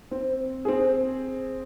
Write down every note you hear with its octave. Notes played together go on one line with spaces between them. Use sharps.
C4
C4 G#4